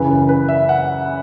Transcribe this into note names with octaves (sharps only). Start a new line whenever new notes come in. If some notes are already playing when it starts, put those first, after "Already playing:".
Already playing: F#2 C#3 E3 B4
A#4
B4
E5
F#5